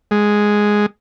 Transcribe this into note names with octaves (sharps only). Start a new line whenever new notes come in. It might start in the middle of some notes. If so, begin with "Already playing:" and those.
G#3